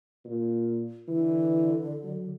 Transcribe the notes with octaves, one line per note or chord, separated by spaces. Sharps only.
A#2
D3 E3
F#3